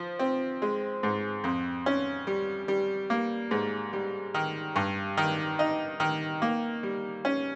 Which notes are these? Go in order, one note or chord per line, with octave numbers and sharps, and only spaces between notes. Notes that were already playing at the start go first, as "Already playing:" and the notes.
Already playing: F3
C4
G#3
G#2
F2
C#4
G3
G3
A#3
G#2
G3
D#3
G2
D#3
D#4
D#3
A#3
G3
C#4